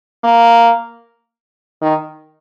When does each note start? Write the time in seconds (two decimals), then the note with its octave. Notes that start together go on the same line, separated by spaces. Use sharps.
0.24 A#3
1.82 D#3